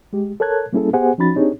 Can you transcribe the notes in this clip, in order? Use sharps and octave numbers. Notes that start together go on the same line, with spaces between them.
G#3 G4
A4 A#4 C#5 A5 F#6 G#6
G3 A#3 C#4 E4 G#4 A4
B3 G4 G#4 C5 F#5 G#5
F3 C#4 D#4 F#4 B5 A6
C4 D4 D#4 G4 G#4 C#5